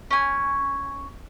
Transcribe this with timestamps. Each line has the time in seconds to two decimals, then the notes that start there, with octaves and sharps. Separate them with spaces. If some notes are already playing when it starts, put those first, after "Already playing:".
0.11 C#4 G#5